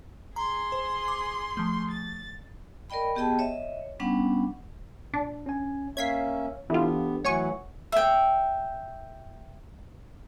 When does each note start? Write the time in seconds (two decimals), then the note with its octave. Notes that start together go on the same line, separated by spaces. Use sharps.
0.36 G#4 A#5 C6
0.72 C5
1.08 D6
1.57 F3 A3
1.91 A6
2.90 A#4 D5 D#5 G5 B5
3.15 B3 G4 G#4 D#5 G5 A5
3.39 C#5 D#5 E5
4.00 G3 B3 C#4 D4 F#5
5.14 A#2 D4
5.46 C#4 G#5
5.97 A#3 C#4 C#5 E5 F5 G#6 B6 C7
6.70 E3 B3 D4 F4 G4 A4
7.25 E3 F#3 A3 C#5 F#5 G#5 C#6
7.92 E5 G5